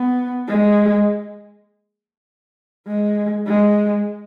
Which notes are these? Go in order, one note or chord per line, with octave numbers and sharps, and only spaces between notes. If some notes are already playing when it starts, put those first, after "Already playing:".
Already playing: B3
G#3
G#3
G#3